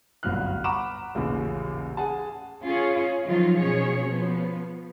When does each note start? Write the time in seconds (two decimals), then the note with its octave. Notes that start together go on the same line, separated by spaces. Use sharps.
0.23 G1 C2 F#3 G3 F6 F#6
0.64 F#5 A#5 B5 C#6 D6 E7
1.15 A1 D#2 A#2 C#3
1.97 G#4 F#5 G#5 A5
2.63 C#4 F4 G#4 C#5
3.26 D#3 F3 F#3 D#4 F4
3.58 B2 C#4 G#4 C#5
4.06 F3 B3